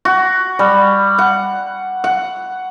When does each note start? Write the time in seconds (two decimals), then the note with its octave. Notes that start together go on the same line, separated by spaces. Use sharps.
0.05 F#4
0.59 G3
1.18 F#5
2.04 F#5